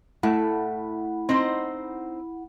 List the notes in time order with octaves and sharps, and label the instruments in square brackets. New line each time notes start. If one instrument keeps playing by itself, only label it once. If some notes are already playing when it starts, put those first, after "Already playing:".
[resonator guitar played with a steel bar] A2 [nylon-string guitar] A3 [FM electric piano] E4 F#5 B5
[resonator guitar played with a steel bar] C4 D#4 C5